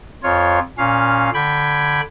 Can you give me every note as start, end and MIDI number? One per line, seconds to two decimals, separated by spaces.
0.23 0.59 41
0.23 0.59 65
0.23 0.59 73
0.78 1.30 46
0.78 1.30 61
0.78 1.30 77
1.34 2.01 50
1.34 2.01 79
1.34 2.01 83
1.34 2.01 92